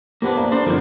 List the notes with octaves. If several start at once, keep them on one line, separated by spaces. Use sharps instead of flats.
A#3 B3 D4 G4 B4 C5
D5 A#5
D4 A4 C5 D5
G1 F#2 D#3 F3 G6